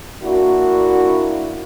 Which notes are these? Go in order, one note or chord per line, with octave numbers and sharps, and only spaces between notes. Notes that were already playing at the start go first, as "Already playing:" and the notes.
A#3 D4 E4 F#4